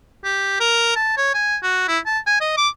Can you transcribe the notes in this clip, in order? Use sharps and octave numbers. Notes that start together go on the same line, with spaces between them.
G4
A#4
A5
C#5
G#5
F#4
E4
A5
G#5
D#5
D6